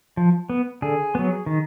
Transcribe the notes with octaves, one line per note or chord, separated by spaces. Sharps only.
F3
B3
D3 G#4
F#3 B3
D#3